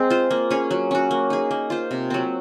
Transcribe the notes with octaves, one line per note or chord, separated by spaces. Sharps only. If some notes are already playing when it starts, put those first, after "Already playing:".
Already playing: G#3 C4 G#4
F4 C5
A#3
C#4 G#4
F#3
C#4 F#4
A#3
D#4 G#4
A#3
F4 C5
C3
F#3 C4